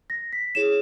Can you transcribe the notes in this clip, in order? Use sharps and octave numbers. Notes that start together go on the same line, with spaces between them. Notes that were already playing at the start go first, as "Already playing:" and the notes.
A#6
B6
E4 G#4 C#5 E7